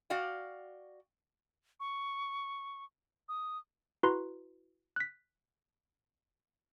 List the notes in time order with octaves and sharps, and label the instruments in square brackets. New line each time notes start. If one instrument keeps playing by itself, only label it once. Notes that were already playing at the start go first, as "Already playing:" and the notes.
[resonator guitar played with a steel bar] F#4 D5 F5 G5
[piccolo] C#6
D#6
[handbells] E4 F#4 B4 A#5 C6
F#6 B6